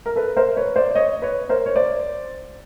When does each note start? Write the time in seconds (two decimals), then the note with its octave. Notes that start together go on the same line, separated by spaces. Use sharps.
0.06 A#4
0.16 A4 B4
0.36 A#4 C5
0.57 B4 C#5
0.76 C5 D5
0.91 D5
0.95 C#5 D#5
1.22 B4 C#5
1.49 A#4 C5
1.66 C#5
1.76 C5 D5